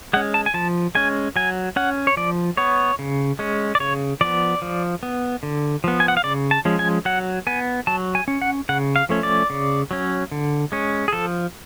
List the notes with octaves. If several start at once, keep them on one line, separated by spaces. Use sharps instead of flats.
G#3 C#4 F#5
A5
G#5
F3 A5
G#3 C#4 G#5
F#3 G#5
C#4 F#5
C#5
F3 D5
B3 C#5
C#3
G#3 C#4
D5
C#3 C#5
F3 B3 D5
F3
B3
D3
F3 B3
G#5
F#5
F5
C#3 D5
A5
F3 G#3 C#4
G#5
F#3 F#5
B3 G#5
F#3 A5
G#5
C#4
F#5
C#3 F#5
F5
F3 A3 C#4
D5
C#3
F#3 C#4
D3
G#3 C#4
G#4
F3 A4